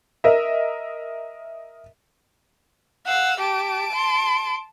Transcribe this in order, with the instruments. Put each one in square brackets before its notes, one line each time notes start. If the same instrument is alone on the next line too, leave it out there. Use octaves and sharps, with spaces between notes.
[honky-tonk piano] A#4 D#5 E5
[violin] F5 E6 [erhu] F#5
[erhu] G4 [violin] A5 D7
[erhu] C6